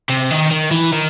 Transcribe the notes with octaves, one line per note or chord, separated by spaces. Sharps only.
C3
D#3
D#3
E3
D#3